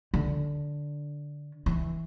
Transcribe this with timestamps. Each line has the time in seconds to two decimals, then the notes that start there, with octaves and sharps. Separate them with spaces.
0.14 D3
1.66 E3